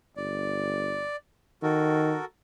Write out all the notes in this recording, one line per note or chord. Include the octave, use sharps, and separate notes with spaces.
G1 D5
D#3 F#4 A4 A#4